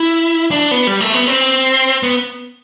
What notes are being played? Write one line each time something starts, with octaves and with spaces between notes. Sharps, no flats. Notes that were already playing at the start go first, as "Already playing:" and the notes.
Already playing: E4
D4
B3
G3
A3
B3
C4
B3